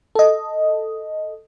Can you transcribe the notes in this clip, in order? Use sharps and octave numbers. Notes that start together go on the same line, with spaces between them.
A4 D#5